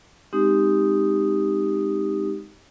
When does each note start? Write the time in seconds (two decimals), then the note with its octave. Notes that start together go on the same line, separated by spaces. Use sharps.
0.33 G#3 C4 D#4 G4 D#6